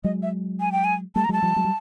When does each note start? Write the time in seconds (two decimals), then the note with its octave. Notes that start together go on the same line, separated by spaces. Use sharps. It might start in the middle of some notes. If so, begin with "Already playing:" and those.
0.04 F#3 G#3 D#5
0.23 E5
0.60 G#5
0.72 G5
0.84 G#5
1.15 G3 A3 A5
1.24 A#5
1.29 F#3 G#3 A5
1.42 F3 G3
1.56 F#3 G#3
1.65 G3